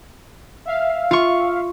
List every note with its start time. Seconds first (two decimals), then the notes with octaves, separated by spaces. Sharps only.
0.65 E5 F5
1.11 F4 C#6